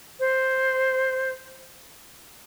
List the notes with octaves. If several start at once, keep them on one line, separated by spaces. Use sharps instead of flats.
C5